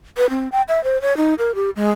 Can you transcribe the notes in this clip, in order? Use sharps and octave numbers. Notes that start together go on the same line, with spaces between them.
B4
C4
G5
E5
C5
C#5
D#4
A#4
G4
G#3